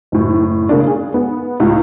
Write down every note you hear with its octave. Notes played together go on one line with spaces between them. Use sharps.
F#1 A2
C#3 A#3 D4
G#4
B3
C#2 A2